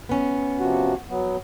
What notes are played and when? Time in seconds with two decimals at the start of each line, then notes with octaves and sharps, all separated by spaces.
0.09 B3 C#4
0.59 C3 F3 F#4
1.09 F#3 B3